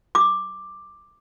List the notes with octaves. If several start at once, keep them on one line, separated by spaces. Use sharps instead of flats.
D6